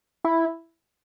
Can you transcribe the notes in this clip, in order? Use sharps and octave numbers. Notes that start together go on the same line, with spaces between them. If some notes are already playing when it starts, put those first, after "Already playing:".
E4